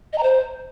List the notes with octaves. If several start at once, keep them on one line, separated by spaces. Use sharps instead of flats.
D#5
A#5
C5